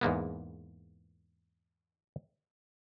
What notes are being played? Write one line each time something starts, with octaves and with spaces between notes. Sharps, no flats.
E2 G#2 A#3 B3